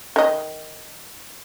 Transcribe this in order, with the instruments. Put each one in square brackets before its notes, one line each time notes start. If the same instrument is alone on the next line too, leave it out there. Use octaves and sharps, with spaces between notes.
[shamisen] D#3 D#5